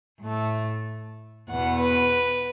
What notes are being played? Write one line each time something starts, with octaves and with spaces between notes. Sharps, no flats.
A2 A3
E2 B2 B3 F#5
B4